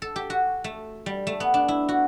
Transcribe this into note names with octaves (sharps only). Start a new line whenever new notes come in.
A4
G4
F#4
A3
G3
A3
B3
D4
E4
F#4